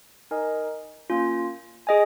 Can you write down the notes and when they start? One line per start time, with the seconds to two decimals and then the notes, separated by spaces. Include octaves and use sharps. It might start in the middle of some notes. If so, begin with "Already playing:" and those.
0.31 D#4 A#4 D#5 G#5
1.10 A#3 C#4 F4
1.87 G#4 D#5 G#5